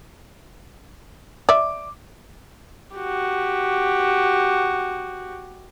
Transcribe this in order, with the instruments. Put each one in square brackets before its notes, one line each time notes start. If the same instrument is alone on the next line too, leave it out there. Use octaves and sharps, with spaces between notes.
[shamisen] D5 E5 [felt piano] D6
[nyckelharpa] F#4 G4